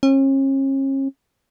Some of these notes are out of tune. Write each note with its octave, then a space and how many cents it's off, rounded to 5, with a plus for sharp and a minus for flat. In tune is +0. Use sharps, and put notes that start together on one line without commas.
C#4 -40